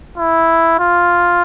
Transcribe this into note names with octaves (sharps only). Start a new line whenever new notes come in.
E4
F4